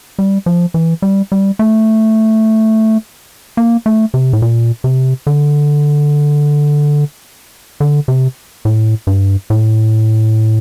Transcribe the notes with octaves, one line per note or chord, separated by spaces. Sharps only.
G3
F3
E3
G3
G3
A3
A#3
A3
C3
A2
A#2
C3
D3
D3
C3
A2
G2
A2